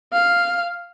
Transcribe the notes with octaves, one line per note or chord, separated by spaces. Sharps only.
F5